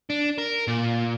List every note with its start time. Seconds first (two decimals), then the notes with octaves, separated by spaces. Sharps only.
0.10 D4
0.38 A#4
0.67 A#2